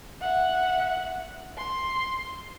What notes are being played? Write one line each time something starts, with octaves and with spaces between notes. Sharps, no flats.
E5 F#5
C6